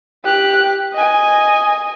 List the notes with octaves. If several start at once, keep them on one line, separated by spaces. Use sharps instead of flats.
G4 F#6
D#5 G#5